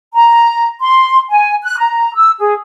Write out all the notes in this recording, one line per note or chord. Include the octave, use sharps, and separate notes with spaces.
A#5
C6
G#5
F#6
A#5
E6
G#4